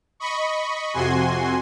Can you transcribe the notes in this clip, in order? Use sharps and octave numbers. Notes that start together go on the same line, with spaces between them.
D#5 B5 C#6
F2 C3 F#4 G#5 C6